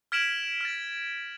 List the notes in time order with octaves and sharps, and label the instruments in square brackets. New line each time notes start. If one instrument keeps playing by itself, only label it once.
[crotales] F6 G#6 B6 D7 E7 F#7
F6 A6